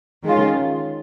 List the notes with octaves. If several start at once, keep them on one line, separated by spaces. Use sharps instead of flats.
D#3 G#3 C#4 F4